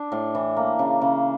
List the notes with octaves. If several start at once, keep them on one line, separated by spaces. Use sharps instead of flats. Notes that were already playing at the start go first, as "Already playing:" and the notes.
Already playing: D4
A2
E3
A#3
C#3
C#3